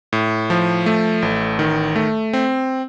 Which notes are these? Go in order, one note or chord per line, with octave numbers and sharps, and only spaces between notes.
A2
F3
A3
A1
D#3
A3
C4